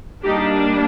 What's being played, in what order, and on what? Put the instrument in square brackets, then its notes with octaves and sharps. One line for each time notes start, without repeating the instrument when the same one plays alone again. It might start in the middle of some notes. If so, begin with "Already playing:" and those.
[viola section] G3 A#3 D4 D#4 G4